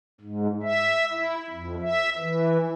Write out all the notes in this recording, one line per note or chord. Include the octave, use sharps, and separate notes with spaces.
G#2
E5
E4
F2
E5
E3